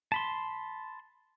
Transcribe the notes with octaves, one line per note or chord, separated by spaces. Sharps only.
A5 B5 C6